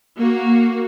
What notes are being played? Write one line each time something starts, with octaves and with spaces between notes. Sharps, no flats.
A#3 F#4